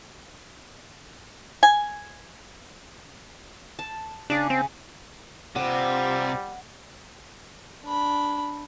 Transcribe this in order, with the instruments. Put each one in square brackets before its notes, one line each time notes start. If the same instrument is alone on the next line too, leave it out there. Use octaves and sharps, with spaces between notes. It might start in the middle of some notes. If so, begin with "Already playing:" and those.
[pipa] G#5
[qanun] A5
[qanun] C#3 G#4 [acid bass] D4
[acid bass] C4
[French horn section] G2 F4 C5 [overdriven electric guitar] C3 [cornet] G3 [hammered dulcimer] F#5
[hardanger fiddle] D4 B5